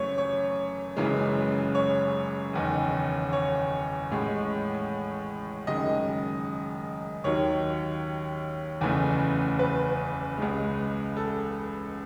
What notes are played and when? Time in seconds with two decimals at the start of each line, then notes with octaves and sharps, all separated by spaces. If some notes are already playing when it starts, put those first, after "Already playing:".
Already playing: F#2 C#3 E3 A3 C#5
0.18 C#5
0.96 F#1 F#2 C#3 E3 G#3
1.75 C#5
2.53 F#1 E2 D#3
3.32 C#5
4.11 A1 A2 G#3
5.67 F#1 F#2 D#3 G#3 D#5
7.24 D#2 D#3 F#3 C#5
8.81 F#1 E2 C#3 E3 A3
9.59 B4
10.37 C#2 C#3 G#3
11.17 A4